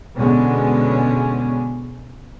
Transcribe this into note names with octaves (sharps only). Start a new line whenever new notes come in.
B2 D3 G#3 B3 C#4